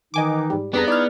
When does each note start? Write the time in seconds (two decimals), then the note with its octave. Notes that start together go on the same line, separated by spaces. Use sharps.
0.14 D#3 E3 D#4 D#5 G#5 D6
0.50 G#2 G3
0.73 F2 G3 B3 D4 G#4 B4 A#5
0.88 D#4 E4 G#4 D5 F6